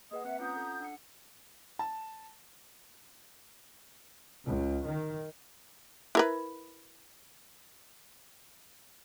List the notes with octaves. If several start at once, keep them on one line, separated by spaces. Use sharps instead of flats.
A#3 G#4 B4 D#5 F#5 D#6
C4 E5 F#5 F#6 C#7
C#4 F4 F#5 A#5 D#6 G6
A4 F#5
D4 F#5 C#7
A5
C#2
D#3
E4 A#4 B4